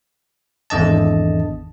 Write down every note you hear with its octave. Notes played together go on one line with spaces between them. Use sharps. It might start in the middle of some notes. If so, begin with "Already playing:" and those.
G#1 E2 D3 D#5 A5